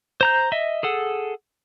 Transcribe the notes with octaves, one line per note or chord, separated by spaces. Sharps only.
C5 A#5 G6
D#5 E5
G#4 A4 F#5